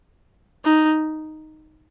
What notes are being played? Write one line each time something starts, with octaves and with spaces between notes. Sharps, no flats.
D#4